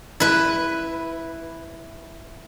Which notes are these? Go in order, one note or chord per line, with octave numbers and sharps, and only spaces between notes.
E4 B4